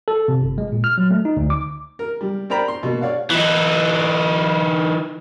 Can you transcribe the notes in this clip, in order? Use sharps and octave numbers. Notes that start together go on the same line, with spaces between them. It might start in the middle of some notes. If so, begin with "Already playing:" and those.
A4
C3
G1
G#3
A#2
F6
F#3
A3
D#4
D2
D6
A#4
G3
A#4 C5 D5 G5 A#5 B5
C6
B2 A#3
C#5 D5 F5 F#5
E3 D#4